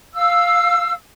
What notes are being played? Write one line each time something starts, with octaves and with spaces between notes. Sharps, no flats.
F5 E6